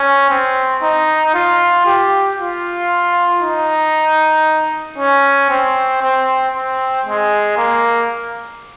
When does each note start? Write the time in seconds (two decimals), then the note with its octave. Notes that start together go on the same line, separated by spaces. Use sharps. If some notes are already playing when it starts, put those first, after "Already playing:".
Already playing: C#4
0.30 C4
0.82 D#4
1.34 F4
1.86 G4
2.38 F4
3.42 D#4
4.98 C#4
5.50 C4
6.02 C4
6.54 C4
7.06 G#3
7.57 A#3